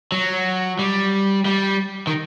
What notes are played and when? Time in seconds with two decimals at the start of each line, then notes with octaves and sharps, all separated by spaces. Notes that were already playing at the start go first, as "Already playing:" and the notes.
0.12 F#3
0.79 G3
1.45 G3
2.07 D#3